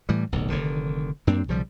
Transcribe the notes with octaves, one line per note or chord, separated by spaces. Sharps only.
A2 E3 G3
D1 B1
F1 D3 D#3
F#2 A#3 C4 D4
B1 C#3 F3 G3